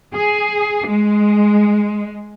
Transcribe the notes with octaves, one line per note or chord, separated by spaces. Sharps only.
G#4
G#3